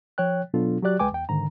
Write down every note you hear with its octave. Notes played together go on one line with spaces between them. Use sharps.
F3 C#5 G5 F#6
B2 F#3 B3 D4 F4 A4
F#3 F#4 G4 D5 F#6
C#2 G#3 B4 G5 G#5 D6
E2 G5
G#2 D3 D#3 A#5